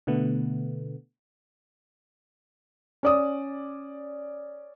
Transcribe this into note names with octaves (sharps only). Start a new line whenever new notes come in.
B2 D3 A3 B3
C#4 D5 D#6